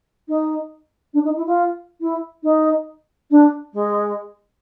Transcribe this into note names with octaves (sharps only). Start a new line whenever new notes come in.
D#4
D4
D#4
E4
F4
E4
D#4
D4
G#3